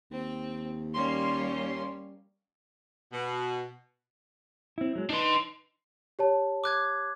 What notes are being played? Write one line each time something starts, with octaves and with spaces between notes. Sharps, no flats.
D#2 C4
G3 A#3 C#4 C6
B2
C4 E4
F#3 G#3
D4 D#4 B4 C6
G4 C#5 A5
D6 F#6 G#6